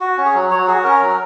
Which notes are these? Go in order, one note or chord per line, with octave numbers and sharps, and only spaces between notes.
F#4
C#4
G#4
F#3
F#3 C#5
F#4 G#4
C#4 A#4
F#3